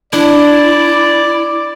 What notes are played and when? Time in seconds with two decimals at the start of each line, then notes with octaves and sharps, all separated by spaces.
0.13 D4 E4 D5